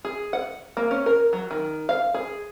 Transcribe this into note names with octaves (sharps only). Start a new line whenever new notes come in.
G#4
F#5
A#3
C#4
A#4
F#3
D#3
F5
G#4